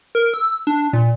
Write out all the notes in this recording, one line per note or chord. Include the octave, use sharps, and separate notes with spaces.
A#4
E6
D4
A#2